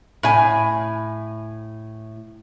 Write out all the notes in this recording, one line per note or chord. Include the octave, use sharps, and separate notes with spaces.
A2 G#5